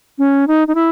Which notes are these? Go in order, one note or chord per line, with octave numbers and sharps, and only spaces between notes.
C#4
D#4
D#4
E4